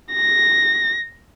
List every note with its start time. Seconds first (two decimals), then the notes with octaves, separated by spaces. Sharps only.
0.13 A#6